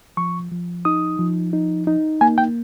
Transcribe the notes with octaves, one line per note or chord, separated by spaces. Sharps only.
F3 C#6
F3
D#4 D#6
F3
D#4
D#4
A#3 G#5
G5